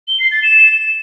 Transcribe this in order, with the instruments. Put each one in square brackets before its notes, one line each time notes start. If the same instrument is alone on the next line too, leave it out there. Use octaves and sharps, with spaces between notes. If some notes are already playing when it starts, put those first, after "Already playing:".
[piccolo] G7
C7
A6
E7